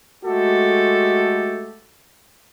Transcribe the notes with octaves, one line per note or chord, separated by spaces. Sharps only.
G#3 A3 F#4 G4 A4